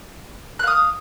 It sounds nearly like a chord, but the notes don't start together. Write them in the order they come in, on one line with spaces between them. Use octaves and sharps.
F#6 F5 D#6